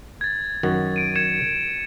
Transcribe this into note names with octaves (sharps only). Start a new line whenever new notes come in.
G#6 A6
F#2 D#3 F#4
D7 D#7
G#6 C#7 E7